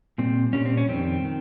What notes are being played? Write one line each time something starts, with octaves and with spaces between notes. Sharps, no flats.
A#2 G3 C4
A#2 G3 C#4
C4
C#4
F2 D#3 G3 C4
D#3